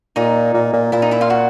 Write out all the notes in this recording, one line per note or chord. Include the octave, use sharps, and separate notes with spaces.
A#2 D#4 D#5
A#2
A#2
A#2 E4 E5
D#4 D#5
E4 E5
F4 F5
F#4 F#5